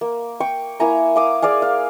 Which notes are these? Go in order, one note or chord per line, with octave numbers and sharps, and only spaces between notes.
A#3
G5 C#6
A#3 E4 G#5 A#5
F5 D6 D#6
G#4 D5 F5 G#5
F5